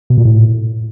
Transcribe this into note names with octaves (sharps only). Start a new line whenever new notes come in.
B2
A#2
A2